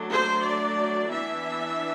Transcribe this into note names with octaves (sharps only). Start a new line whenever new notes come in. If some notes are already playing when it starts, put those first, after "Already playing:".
Already playing: F#3 A3 D4
C5
D5
E3 B3 D4 E5